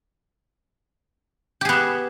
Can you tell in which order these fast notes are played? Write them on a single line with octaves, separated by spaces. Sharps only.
G4 G#4 B3 E5